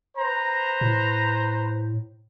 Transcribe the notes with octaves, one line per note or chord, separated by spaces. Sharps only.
B4 C5 A#5
A2